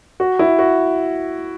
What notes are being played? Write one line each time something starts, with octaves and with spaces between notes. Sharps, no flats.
F#4
E4
F#4